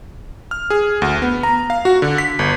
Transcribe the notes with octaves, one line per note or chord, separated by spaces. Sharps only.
F6
G#4
D2
B3
A#5
F5
F#4
D3
B6
G1